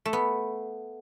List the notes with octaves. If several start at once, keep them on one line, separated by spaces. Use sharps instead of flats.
A3
B3